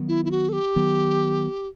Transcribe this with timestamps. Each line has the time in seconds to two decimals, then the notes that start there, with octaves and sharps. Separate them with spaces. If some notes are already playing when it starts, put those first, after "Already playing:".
Already playing: D#3 F#3 B3
0.08 E4
0.25 E4
0.31 F#4
0.49 A4
0.53 G4
0.76 D#3 F#3 B3